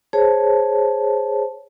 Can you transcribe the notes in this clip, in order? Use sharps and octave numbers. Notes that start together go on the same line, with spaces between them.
G#4 C5 C#5 A5